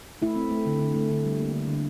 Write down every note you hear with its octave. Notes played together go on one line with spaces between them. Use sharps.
A3 E4
C4
A3
D3
D3
A3
D3
G3
A#3
D3
D3